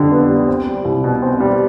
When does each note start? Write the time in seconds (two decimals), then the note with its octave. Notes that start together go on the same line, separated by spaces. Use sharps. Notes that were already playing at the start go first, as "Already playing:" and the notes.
Already playing: F2 D3 G3
0.11 B3
0.29 G3
0.47 C4
0.67 G3
0.85 C2
1.04 B2
1.22 C4
1.40 G3